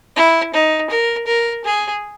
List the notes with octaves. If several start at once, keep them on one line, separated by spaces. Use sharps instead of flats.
E4
D#4
A#4
A#4
G#4